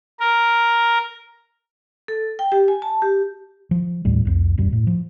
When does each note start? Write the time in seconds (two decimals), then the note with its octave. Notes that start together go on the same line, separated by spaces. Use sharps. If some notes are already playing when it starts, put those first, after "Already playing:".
0.20 A#4
2.08 A4
2.39 G5
2.52 G4
2.68 G#5
2.82 A5
3.02 G4
3.71 F3
4.05 D#2 A2 G3
4.25 C2 F2
4.58 D#1 F#2 G3
4.73 A2
4.87 F3